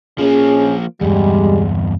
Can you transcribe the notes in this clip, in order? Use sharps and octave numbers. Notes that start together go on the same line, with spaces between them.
F3 A#3 C#4 G#4
E2 G2 G3 G#3